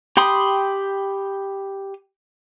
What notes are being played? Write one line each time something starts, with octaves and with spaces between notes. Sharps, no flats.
G4 G5 B5 C6 D#6